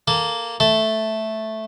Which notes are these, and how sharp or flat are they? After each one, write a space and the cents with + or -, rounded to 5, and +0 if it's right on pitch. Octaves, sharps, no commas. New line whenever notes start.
A#3 +0 A4 -10
A3 -5 A4 +0